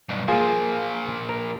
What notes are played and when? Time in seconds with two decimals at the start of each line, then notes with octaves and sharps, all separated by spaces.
0.09 B1 G2
0.28 A#2 F3 A#3 F4 G#4
1.29 A#4